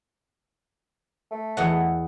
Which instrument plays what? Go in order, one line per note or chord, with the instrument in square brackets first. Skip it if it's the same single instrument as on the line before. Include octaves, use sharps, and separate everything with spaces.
[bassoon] A3
[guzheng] E2 D#5 F#5